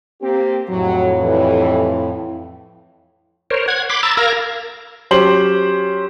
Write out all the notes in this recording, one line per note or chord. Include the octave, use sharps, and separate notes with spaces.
A#3 C4 G4
F2 A2 F#3
G2 E3
A#4 C5 C#5
F#5 G#6
B5 C6 D6
A#5 B5 E6 A6
A#4 F5 A#5 E6 G#6 A#6
F#3 C#4 G4 C5 C6 F#7